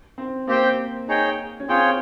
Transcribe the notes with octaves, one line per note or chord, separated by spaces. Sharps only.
C4
A#3 C4 G4 C5 G5
D#4 G#4 C#5 G5
C#4
C4 F4 G#4 C#5 G5